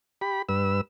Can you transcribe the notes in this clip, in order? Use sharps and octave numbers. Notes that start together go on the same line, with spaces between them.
G4 B5
G2 B4 E6